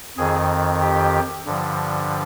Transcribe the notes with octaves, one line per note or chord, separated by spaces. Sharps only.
F2 D#3 G#4
G4
G2 D3 F3